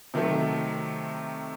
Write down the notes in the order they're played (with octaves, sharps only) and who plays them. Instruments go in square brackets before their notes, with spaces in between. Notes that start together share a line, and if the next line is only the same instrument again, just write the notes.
[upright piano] C3 D#3 F#3 A3